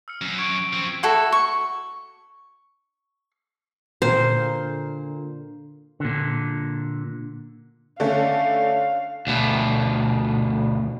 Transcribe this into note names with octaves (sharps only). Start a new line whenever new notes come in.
E6 F6 C#7
F#2
C#6 G#6 D7
F3 C4
E4 F#4 A4
C#6
A#2 D3 C5
A#2 D3
D3 A3 C#4 F5
D2 B2